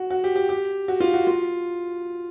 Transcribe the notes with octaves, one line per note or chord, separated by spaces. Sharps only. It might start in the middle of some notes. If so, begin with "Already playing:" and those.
Already playing: F#4
F#4
G4
G4
G4
F#4
F4
F#4
F4